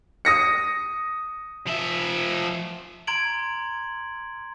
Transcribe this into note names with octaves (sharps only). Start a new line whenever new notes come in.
D#6 A#6 C#7
F3 E5
A#5 C6 G#6 D7 F#7